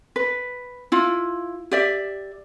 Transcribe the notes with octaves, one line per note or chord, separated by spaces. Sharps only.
B4
E4 F4
G4 D5 E5